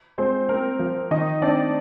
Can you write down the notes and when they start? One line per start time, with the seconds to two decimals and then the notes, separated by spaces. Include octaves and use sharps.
0.18 G#3 C4 C5
0.49 A#3 C4 A#4
0.79 F3
1.11 D#3 D#4 D#5
1.42 C4 D4 D5